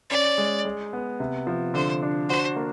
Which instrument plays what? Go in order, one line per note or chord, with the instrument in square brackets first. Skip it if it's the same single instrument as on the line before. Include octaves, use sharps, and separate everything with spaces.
[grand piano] C#4 [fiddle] D5
[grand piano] G#3
G#3
B3
C3
F3
[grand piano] D3 [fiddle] C5
[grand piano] D4
[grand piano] F#4 [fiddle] C5
[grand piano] A#3